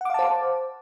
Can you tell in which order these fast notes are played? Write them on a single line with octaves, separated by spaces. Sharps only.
F#5 D6 F5 A5 C5